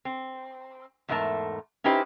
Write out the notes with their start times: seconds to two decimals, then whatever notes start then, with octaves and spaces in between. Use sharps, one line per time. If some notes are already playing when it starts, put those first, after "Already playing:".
0.05 C4
1.08 E2 G#2 A3 E4 A#4 A5
1.84 C#4 D#4 E4 G4 B4 C5